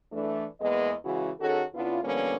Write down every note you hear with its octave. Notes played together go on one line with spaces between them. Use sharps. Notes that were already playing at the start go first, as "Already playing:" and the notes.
E3 A3 D4
E2 G#3 A#3 B3 D#5
C#3 E3 G#3 E4 F#4
D#3 C#4 F#4 G#4 A4
C#3 B3 D4 E4 F4
D3 F3 G3 A#3 B3 C#4